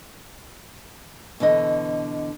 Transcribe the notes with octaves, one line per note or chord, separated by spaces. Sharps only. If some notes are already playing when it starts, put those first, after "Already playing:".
B2 D3 E3 D#5